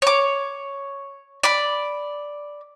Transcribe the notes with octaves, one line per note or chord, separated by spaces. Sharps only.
C#5 D6
D5 B5